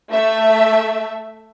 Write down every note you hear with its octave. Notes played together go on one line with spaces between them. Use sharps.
A3 E5